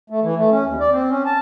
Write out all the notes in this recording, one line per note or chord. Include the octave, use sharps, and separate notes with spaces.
A3
E3
A3
C#4
D#2
D5
C4
C#4
A5